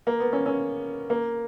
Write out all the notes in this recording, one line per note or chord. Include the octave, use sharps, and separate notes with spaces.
A#3
B3
C#4
C#4
A#3